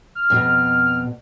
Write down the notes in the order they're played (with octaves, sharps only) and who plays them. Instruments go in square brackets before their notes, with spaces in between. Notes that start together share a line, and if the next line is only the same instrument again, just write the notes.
[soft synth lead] F6
[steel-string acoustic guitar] F2 B2